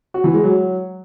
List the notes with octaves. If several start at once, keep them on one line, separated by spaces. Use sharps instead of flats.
F#4
E3
G#3
F#3